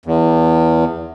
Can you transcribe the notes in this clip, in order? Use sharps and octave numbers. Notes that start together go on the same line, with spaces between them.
E2